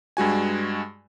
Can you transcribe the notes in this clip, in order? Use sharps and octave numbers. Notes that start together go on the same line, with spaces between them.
G2 G#3 F#4 G#5